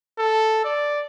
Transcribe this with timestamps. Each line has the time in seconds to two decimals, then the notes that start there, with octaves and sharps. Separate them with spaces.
0.18 A4
0.65 D5